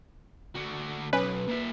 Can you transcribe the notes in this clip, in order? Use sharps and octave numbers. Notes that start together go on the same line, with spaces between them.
D3 F#4
B1 C#4 B4
A#2 E5